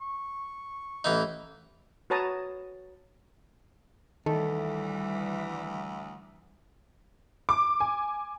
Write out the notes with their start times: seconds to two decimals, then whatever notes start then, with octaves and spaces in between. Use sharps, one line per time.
0.01 C#6
1.04 A1 E3 D#4
2.10 F#4 B4 C#5 A5 A#5 D#6
4.26 D2 D#3 E3 G3 A4
7.49 D6
7.80 G#5